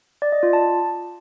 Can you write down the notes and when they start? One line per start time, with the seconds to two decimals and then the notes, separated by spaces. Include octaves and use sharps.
0.22 D5
0.32 D#5
0.43 F4
0.53 A5